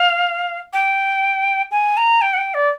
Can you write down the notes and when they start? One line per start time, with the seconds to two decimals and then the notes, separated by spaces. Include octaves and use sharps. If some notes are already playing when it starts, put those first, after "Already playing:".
Already playing: F5
0.73 G5
1.71 G#5
1.97 A#5
2.21 G5
2.33 F#5
2.38 G5
2.54 D5